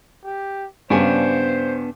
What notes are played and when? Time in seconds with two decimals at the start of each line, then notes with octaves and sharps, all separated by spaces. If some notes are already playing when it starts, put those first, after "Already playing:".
0.24 G4
0.90 G2 C#3 B3 D4 C5 G#5